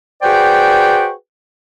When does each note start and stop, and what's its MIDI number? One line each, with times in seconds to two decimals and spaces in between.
0.22 1.11 66
0.22 1.11 68
0.22 1.11 71
0.22 1.11 72
0.22 1.11 74
0.22 1.11 79